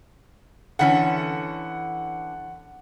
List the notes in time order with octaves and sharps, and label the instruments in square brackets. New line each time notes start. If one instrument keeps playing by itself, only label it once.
[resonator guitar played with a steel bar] D3 E3 C#4 [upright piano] F#5